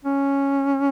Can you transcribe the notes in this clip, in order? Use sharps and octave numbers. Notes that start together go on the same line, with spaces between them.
C#4